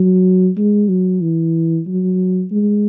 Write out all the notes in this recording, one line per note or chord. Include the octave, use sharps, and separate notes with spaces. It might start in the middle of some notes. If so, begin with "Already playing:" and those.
Already playing: F#3
G#3
F#3
E3
F#3
G#3